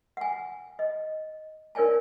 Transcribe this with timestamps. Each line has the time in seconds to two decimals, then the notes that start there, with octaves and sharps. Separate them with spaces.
0.17 F#5 G#5
0.79 D#5
1.75 D#4 A#4 C#5 D5 G#5 A5